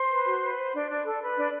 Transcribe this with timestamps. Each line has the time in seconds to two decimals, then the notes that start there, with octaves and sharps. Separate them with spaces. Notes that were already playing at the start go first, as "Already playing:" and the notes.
Already playing: C5 C6
0.10 B4
0.25 F#4
0.41 B4
0.57 C5
0.74 D4
0.90 D4
1.05 A4
1.22 B4
1.38 D4